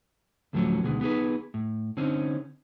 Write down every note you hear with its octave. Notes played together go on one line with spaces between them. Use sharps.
D2 A2 F3 F#3 A3 C#4
D2 B2 D#3 G#3
B3 D#4 G#4 B4
A2
D3 C4 C#4 D#4